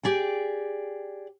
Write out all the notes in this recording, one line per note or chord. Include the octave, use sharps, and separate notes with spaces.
G4 G#4 D5 G5